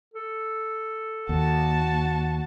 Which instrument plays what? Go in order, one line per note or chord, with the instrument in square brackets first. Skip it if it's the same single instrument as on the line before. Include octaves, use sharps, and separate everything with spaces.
[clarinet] A4
[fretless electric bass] D#2 [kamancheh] F#4 A5